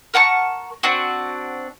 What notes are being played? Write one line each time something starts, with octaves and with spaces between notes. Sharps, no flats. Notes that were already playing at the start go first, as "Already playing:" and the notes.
A#4 F#5 A5 C#6
C4 D4 F#4